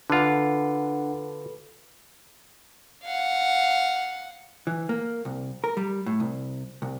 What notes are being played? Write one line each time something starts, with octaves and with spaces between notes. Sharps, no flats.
D3 D4 F4 A4 B4 F#5 B5
F5 F#5
E3
A#3
C2
A#4
G3
A2
C2
C2